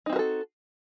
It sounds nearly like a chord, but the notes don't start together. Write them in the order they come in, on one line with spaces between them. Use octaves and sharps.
D#4 C4 F#4 A#4 A4